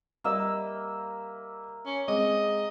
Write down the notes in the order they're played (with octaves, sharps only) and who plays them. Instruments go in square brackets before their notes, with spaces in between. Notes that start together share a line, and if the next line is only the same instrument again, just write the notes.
[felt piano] G3 D#5 [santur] A#3 E5 E6
[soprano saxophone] C#4
[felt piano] G#3 C4 D6 [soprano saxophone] D#5